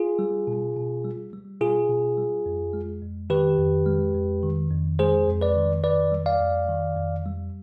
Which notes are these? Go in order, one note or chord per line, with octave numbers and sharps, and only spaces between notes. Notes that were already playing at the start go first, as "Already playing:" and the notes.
Already playing: F4 G#4
G3
B2
B2
G3
G3
B2 F4 G#4
B2
G3
F2
G#3
F2
D#3 G4 B4
F2
G#3
F2
D#3
F2
G#3 G#4 C5
F2
B4 D5
D#3
F2 B4 D5
G3
D5 F5
F2
D#3
F2
G3